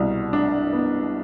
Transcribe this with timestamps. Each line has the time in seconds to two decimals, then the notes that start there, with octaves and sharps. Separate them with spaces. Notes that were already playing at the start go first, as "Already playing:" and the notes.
Already playing: C2 B2
0.33 D4
0.73 B3